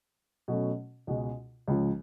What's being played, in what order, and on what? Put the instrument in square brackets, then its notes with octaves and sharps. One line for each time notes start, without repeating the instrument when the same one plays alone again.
[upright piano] B2 F#3 A3 C#4
C#2 B2 G#3
C#2 C#3 F3